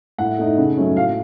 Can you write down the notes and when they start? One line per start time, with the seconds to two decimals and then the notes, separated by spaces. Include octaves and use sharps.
0.18 A2 F#5
0.39 A3 D#4
0.57 C#3
0.77 F#3 A3 C#4
0.96 A2 F5